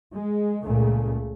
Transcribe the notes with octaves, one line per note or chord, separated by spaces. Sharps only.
G#3
C#2 A#2 C#3 A3